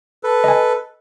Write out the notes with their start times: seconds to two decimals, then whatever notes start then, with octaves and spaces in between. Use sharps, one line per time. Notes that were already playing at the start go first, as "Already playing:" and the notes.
0.24 A4 B4
0.44 D#5 G#5